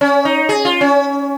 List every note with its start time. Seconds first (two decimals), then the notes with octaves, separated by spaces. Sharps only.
0.01 C#4
0.25 D#4
0.49 G#4
0.65 F4
0.81 C#4